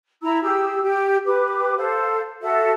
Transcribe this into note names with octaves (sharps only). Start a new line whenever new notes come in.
E4 A#5 E6
G4 G#4 E6
G4
G4 B4 D6
A4 C5 F5
F#4 A4 E5